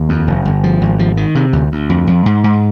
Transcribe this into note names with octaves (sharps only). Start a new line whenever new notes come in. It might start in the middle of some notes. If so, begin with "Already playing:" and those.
Already playing: D#2
F2
F1
G1
F3
G#1
F3
D#3
C3
D2
D2
F2
F2
G#2
G#2